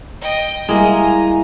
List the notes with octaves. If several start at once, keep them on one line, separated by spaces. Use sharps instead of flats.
D#5 G5
G3 G#3 A#3 E4 G#5 A#5